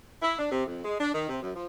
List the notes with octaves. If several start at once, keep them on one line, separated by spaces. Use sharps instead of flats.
E4
D4
C3
F2
G#3
D4
D#3
C3
F#2
F3